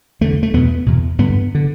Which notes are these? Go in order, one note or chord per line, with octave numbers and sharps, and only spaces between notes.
E2 D3 A3
A3
E2 B2 B3
E2 B2
G2 D3 B3
D3